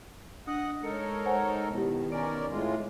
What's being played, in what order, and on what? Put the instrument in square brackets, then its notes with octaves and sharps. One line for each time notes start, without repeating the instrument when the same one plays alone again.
[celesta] D4 D#6 [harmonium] D#5 F#5
[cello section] G#3 C#5 [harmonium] D#4 A4 A#4 [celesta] C#7
[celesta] C5 F#5 G#5
[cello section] B2 D#3 [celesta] E4 G4
[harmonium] C#4 A#4 D5 [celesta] G#5 D7
[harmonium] A2 G#3 F4